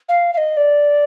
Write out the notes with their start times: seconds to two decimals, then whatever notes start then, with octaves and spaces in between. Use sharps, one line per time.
0.09 F5
0.33 F5
0.37 D#5
0.57 D5